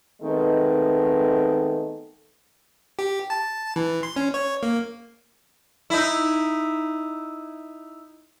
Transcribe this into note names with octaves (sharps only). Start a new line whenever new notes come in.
D#3 G#3 A3 B3 C4 A4
G4
A5
E3
C6
C#4
C#5
A#3
D#4 E4